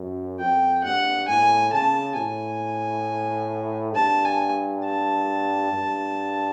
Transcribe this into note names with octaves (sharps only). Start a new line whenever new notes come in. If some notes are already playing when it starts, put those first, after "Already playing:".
Already playing: F#2
F2 G5
G2 F#5
A2 G#5
C#3 A5
A2 G#5
G2 A5
G#5
A5
G2